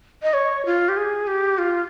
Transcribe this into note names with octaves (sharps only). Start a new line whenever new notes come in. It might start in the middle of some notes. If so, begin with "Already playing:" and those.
D#5
C#5
F4
G4
G#4
G4
F4